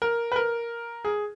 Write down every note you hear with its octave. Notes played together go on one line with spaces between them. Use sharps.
A#4
B4
A#4
G#4